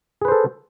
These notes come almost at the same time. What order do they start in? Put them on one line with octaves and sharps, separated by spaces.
G#4 B4 C5 A4